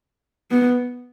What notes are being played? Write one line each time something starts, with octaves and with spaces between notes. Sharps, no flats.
B3